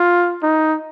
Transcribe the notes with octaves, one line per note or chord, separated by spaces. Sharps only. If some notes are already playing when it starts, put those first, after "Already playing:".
Already playing: F4
D#4